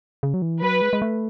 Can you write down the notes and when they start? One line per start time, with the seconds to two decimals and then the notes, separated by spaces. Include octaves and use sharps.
0.23 C#3
0.34 F#3
0.42 E3
0.62 F#3 B4
0.82 G#3
0.93 G#3
1.02 A3